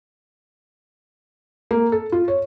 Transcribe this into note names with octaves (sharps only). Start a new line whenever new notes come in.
A#3
A4
F4
C#5